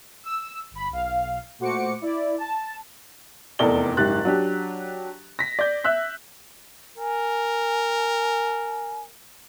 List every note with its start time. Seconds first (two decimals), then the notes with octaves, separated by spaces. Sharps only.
0.24 E6
0.71 G1 B5
0.90 B1 F5
1.59 A#2 A3 F#4 C5 D6 C#7
2.02 E4 D5
2.38 A5
3.59 F1 E2 A4 A#4 D5 G7
3.97 F#1 G#2 G4 F#6 A6
4.25 F#3 D4 G4
5.39 A#6 B6
5.59 D5 G6
5.84 E5 E6 F#6 B6
6.98 A#4 G#5